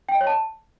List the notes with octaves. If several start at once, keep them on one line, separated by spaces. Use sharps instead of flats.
G5
D#5
C#5
A5